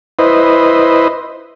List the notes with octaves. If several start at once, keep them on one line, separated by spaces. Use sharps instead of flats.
E4 B4 C5 D#5